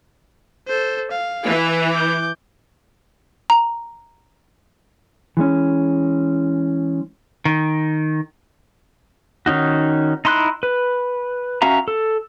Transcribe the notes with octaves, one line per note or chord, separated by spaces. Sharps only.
A4 C5
F5
E3 B4
D6 G6
A#5
E3 G#3 C#4
D#3
D#3 C#4 D#4 F#4
D#4 E4 C6 D6 F#6
B4
C#4 F#4 E5 F5 A#5
A4